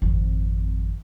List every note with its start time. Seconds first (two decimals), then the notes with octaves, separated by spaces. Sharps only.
0.02 G#1 F2